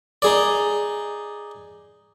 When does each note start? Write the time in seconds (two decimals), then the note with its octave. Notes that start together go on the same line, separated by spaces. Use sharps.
0.22 D#4 G#4 D5